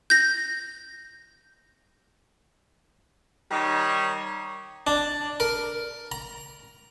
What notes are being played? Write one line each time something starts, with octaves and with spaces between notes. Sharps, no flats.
G6 A#6
D#3 G3 D#4 G4 A#4 C#5
D4
A#4
A#5